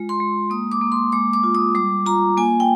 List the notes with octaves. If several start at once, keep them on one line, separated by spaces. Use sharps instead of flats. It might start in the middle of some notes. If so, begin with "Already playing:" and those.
Already playing: G#3 F4
C6
G#3
A#3 D#6
D6
A#3
C6
G#3 D6
D6
F4
D#6
G3 D6
F4 A#5
A#3 G#5
G5